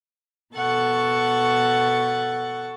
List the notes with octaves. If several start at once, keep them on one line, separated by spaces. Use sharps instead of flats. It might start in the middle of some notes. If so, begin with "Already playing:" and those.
B2 A4 F#5 C#6 A6